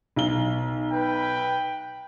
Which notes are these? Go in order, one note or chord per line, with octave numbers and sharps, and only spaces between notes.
B1 G7
B4 G5